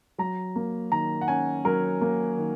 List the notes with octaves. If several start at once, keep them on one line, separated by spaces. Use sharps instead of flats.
F#3 A#5
A#3
D#3 A#5
F#5
C#4 G#5
F#3 A#4
A#3
D#3